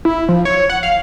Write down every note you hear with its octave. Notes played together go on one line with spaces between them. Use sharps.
E4
F3
C#5
F#5
F5